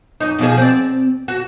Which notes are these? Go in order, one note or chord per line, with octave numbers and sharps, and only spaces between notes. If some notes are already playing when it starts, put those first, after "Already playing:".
F#2 D#4
B2 F3 G#4
C4 D5
F#4